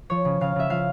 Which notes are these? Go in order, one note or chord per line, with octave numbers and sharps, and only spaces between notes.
F3 C#5
C#3
C#3 F5
C#3 E5
F3 F5